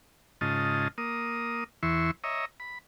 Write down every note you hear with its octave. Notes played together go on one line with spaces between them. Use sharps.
G#2 C#3 F4 D#5 A5
A#3 D#6
E2 E3 E5 C6 C#6
C#5 D#5 E5 A#5
B5